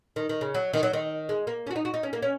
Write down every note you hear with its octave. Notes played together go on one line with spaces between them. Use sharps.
D#3
D#3
C#3
F#3
D#3
F#3
D#3
G#3
A#3
C#4
F#4
D#4
F#4
D#4
C#4
A#3
C#4